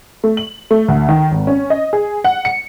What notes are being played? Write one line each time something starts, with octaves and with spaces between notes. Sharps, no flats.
A3
F#7
A3
D2
D#3
G#1
C#4
D#5
G#4
F#5
C#7